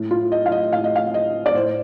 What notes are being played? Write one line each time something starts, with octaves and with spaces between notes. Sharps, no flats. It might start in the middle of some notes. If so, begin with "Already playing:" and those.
Already playing: A2
F4
D#5
F5
D#5
A2 F5
D#5
F5
D#5
D5
A2 C5